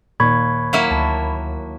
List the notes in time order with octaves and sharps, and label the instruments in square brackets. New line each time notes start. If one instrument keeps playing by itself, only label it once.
[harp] D#2 [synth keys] A#2 [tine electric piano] B5 C#6 G#6
[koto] F#3 A#3 E4
[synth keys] D2 [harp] A5